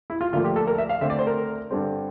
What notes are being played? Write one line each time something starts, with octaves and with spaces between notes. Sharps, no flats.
E4
F4
D2 D3 F3 A#3 F4
G4
A4
A#4
E5
F5
D2 D3 A3 C4 E5
D5
C5
A#4
G2 D3 G3 C4